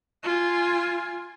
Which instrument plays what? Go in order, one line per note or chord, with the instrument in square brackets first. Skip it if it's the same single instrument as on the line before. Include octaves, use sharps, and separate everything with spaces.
[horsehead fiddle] F4 G#5